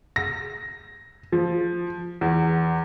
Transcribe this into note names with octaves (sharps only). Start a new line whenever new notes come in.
A#6
F3
E2